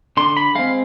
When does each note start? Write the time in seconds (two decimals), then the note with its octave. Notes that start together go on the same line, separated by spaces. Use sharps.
0.17 D3 C6
0.37 B5
0.55 G#3 C4 F5